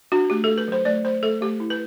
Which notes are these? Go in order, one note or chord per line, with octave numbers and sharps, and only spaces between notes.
D4 F#4
A3 G4
A4
A3
B4
F#3 C5
A3 D5
A3 C5
A3 A4
A3 G4
E4
B4